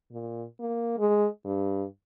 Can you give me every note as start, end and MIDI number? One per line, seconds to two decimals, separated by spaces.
0.12 0.45 46
0.60 0.97 58
0.98 1.27 56
1.45 1.85 43